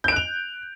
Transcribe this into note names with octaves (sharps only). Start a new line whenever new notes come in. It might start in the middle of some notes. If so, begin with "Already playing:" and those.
F#6 G6 D7 F7